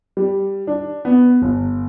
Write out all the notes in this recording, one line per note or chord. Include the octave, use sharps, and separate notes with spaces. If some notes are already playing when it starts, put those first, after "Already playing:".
G3
D4
B3
G1